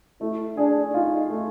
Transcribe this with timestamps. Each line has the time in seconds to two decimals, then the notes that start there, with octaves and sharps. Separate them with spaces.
0.21 A3 E4
0.57 D4 G#4
0.93 D#4 F4
1.30 A3